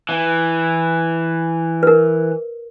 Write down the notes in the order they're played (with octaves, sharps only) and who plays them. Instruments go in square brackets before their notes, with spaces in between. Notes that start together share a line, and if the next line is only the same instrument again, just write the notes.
[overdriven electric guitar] E3
[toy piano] A#4 B4